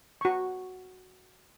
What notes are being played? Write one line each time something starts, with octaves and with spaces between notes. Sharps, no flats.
F#4 C#6